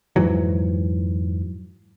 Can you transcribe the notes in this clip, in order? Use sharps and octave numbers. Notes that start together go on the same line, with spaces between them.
F2 G#2 E3 F#3